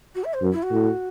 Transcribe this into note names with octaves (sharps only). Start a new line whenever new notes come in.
F#4
E5
C5
F#2
E4
F#4
A2